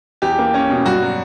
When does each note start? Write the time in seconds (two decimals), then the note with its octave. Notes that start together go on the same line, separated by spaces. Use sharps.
0.22 E2 G4
0.39 A#3
0.54 C#4
0.70 B2
0.86 G2 F#4
1.02 F#3